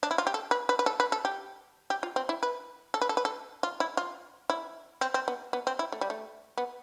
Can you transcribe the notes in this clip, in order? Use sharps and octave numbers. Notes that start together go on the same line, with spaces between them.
D4
E4
F4
G4
A4
B4
B4
B4
A4
B4
A4
G4
G4
F4
C4
E4
B4
A4
B4
A4
B4
A4
F4
E4
F4
E4
C4
C4
B3
B3
C4
E4
A3
G3
A3
B3